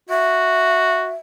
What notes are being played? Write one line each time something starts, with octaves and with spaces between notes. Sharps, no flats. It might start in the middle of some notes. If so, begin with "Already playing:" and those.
F#4 E5